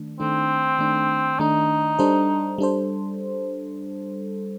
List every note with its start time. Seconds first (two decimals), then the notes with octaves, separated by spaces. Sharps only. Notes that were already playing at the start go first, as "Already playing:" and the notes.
Already playing: D#3 A3 D4
0.20 D#3 A3 C4 D4
0.79 D#3 A3 D4
1.39 D#3 A3 D4 D#4
1.99 G3 D4 A4 C5
2.58 G3 D4 A4 C5